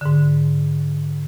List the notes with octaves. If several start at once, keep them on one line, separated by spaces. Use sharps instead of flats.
G#2 D3